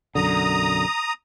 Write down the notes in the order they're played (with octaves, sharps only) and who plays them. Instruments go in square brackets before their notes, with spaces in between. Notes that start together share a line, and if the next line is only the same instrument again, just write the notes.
[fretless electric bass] B1 F#2 D3 [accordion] A#5 D#6